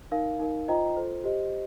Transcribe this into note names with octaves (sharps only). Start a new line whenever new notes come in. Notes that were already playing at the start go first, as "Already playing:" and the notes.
D#4 A#4 F5
D#4 A#4 F5
F4 C5 D#5 G5 A#5
F4 A4 C5
G4 C5 D#5